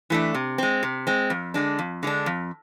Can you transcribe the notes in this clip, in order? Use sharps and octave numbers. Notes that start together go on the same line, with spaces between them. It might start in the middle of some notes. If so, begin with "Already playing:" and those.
E3 A3 D4
C3
G#3 C4
C3
G#3 C4
F2
D3 G#3 D4
F2
D3 G#3 D4
F2